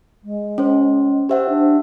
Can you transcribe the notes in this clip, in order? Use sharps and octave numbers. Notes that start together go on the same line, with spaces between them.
G#3
C#4 C5
G4 C5 E5 F#5
D4